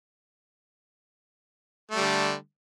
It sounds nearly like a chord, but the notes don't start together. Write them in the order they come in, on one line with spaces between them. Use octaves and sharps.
A3 G3 D3